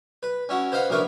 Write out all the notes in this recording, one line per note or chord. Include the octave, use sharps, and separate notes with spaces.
B4
C#4 E4 F#4
B4 C5 D#5 F5 F#5 B5
A#1 E4 A#4 B4 C#6